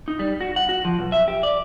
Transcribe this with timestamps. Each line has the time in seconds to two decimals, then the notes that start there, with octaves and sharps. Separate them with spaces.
0.08 D#4
0.19 G3
0.41 F#4
0.56 F#5
0.69 F#4
0.85 F3
0.99 B1
1.12 E5
1.28 G4
1.43 D5